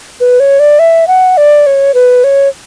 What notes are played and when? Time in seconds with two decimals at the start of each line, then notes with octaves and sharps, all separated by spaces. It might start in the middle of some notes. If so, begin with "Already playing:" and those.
0.20 B4
0.40 C#5
0.59 D5
0.79 E5
1.08 F#5
1.37 D5
1.66 C#5
1.94 B4
2.24 C#5